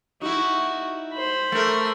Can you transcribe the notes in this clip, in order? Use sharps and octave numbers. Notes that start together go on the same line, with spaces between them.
D#4 E4 F#4
C5 B5
A3 A#4